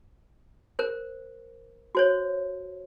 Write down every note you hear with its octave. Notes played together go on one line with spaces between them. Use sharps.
A#4 C5
F#4 C5 C#5